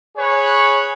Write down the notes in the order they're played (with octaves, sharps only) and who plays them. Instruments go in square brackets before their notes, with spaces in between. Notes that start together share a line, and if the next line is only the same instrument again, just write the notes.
[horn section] G#4 B4 C#5